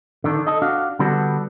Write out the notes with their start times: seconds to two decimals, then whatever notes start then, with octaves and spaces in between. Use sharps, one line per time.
0.24 D3 D#3 D4
0.47 A4 D#5
0.62 D4 F#4 F5
0.99 D3 G3 B3 D4 F#4 A4